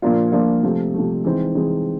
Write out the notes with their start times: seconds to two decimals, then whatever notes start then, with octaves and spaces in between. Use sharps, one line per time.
0.02 A#2 F3 A#3 D4 F4
0.32 A#2 F3 A#3 D4 F4
0.63 C3 F3 A3
0.94 C3 F3 A3
1.25 E3 G#3 C4 D#4
1.55 E3 G#3 C4 D#4